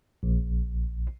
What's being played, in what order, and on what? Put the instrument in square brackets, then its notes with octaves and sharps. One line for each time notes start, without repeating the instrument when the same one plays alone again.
[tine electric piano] A#1